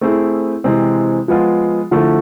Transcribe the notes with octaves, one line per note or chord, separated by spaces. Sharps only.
A3 C4 E4 G#4
C3 E3 G#3 C4
F3 G#3 B3 F4
D3 F3 A3 E4 A4